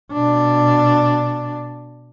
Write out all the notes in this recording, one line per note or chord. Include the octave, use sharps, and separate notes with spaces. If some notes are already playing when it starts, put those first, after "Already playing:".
B2 D4